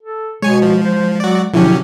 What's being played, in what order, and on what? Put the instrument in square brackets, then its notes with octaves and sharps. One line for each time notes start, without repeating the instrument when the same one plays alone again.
[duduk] A4
[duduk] B2 [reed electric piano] G#3 [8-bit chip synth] C#5 G#5
[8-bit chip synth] F3
[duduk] C5
[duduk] F#3 [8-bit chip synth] F#4 D5
[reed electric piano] B2 F3 E4 [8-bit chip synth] D3 F#3 C#4 [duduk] G4